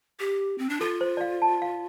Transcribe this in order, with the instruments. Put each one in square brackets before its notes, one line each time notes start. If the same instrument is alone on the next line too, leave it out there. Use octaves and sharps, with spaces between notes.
[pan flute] G4
C4
D4
[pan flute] F4 [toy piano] A4
[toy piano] C5
D5
F5
A5
F5